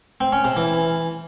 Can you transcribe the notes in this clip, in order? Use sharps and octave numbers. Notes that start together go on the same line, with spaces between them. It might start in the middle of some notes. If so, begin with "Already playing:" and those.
C4
C#4
C3
E3